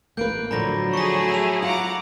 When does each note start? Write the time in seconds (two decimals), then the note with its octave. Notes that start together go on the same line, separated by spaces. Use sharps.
0.17 A1 A#3 B4 G6 D7
0.51 A2 D3 F3 F#3 F#4 A#5 B5 A#6
0.94 A3 G#4 C#6 A#6
1.30 E6 D#7 F7
1.62 F4 F#5 A#5 D6